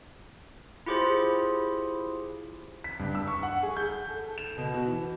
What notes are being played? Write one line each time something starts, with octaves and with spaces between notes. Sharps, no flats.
E4 F4 G4 G#4 C5
B6
G2
E6
C#6
F#5
G#4
G6
A4
E7
B2
F#4
E3